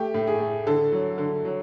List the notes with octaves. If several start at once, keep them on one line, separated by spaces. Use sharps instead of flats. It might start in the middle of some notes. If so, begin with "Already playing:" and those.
Already playing: A3 G4
A2
G#4
A3
D3 A4
F#3
D3
F#3